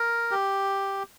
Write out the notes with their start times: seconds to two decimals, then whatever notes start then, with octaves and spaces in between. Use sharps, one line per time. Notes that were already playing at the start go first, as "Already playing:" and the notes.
Already playing: A#4
0.31 G4